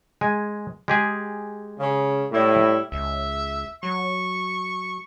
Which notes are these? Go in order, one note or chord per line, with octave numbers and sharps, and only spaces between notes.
G#3 G#5
G#3 G4 G#4
C#3
A2 G3 E4
C#2 E5
F#3 C#6